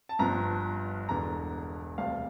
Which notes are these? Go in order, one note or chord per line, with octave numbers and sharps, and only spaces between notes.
A5
G1 G2 F3 A#5
E1 E2 D3 A#5
E1 D2 C3 G3 F5